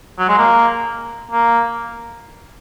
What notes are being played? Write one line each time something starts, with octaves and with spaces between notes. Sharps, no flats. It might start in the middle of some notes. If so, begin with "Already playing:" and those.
F#3
G#3
A#3
A#3